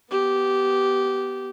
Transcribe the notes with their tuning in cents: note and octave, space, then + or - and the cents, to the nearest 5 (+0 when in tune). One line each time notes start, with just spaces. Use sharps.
B3 +0 G4 -15